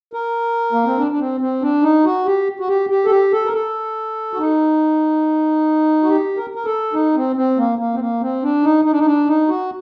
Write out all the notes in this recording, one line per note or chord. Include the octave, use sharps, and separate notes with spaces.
A#4
A#3
C4
D4
D4
C4
C4
D4
D#4
F#4
G4
F#4
G4
G4
A4
G4
A4
A#4
A4
F#4
D#4
F#4
G4
A#4
A#4
A4
D#4
C4
C4
A#3
A#3
C4
A#3
C4
D4
D#4
D#4
D4
D#4
D4
D#4
F#4